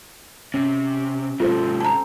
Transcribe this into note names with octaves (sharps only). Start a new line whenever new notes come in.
C3 C#4
G#2 C3 C4 F4 A4 C5
A5 A#5